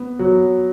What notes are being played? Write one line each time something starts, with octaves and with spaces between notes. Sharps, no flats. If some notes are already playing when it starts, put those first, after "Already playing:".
Already playing: B3
F#3